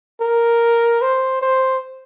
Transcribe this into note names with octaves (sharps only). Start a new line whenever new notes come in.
A#4
C5
C5